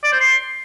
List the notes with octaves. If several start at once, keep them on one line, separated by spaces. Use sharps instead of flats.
D5
C5
C6